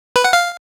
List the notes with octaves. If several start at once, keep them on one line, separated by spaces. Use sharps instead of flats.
B4
F#5
F5